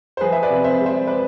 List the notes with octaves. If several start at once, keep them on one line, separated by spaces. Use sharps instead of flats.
C5
F3 G#4 B4
E5
B4 D5
C3
C5 E5
G#3
C5 E5
B4 D5